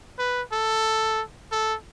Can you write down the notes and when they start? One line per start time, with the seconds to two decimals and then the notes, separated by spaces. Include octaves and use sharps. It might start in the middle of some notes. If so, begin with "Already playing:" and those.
0.19 B4
0.52 A4
1.52 A4